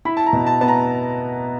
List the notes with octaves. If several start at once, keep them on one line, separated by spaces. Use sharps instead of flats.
E4 B5
A5
A#5
B2
A5
B3 A5
A#5